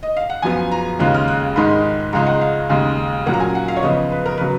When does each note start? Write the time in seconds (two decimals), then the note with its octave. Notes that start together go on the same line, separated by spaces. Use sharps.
0.03 D#5
0.17 F5
0.30 F#5
0.42 F#2 F3 B3 F4 G#5
0.71 A#5
0.99 D#2 C#3 G#3 C#4 F4 F#6
1.14 F6
1.28 F#6
1.56 G#2 D#3 G#3 D#4 B5
2.13 C#2 C#3 G#3 D#4 A#5
2.26 F#5
2.41 F5
2.69 D#2 C#3 G#3
3.26 A#2 F#3 A#3 C#4 F#5
3.34 A#5
3.40 G#5
3.55 F#5
3.68 F5
3.76 C#5
3.83 C#3 F3 B3 D#5
4.12 B4
4.26 A#4
4.37 C#3 F#3 B4